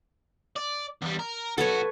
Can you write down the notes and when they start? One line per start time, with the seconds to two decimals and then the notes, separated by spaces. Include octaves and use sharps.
0.56 D5
1.02 E2 G3
1.19 A#4
1.58 B1 F#4 A4 B4 C#5